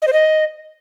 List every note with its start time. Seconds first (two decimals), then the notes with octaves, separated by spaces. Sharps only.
0.02 D#5
0.07 C5
0.13 D#5